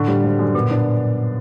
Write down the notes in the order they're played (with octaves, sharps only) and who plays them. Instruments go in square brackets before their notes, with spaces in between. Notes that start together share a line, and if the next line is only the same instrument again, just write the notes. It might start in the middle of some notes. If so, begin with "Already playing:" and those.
Already playing: [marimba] A2 [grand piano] D3
[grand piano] G3
G#1
F#2
[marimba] A#2 [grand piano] B3
[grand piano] D4